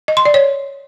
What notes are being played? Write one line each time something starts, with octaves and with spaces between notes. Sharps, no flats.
D#5
C6
D5
C#5